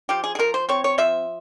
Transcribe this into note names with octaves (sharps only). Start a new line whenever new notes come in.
F3 G4
G#4
G#4
F3 A#4
C5
C4 C#5
C#5
F3 E5